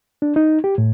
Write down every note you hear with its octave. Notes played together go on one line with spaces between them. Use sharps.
D4
D#4
G4
A2